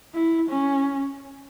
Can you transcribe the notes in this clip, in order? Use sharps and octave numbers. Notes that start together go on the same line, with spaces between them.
E4
C#4